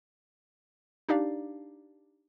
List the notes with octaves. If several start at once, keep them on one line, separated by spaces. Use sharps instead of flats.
D4 D#4 G4 D5 F5